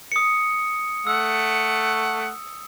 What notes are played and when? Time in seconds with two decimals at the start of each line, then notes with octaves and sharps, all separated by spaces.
0.12 D#6 C#7
1.07 A3 F#5 E6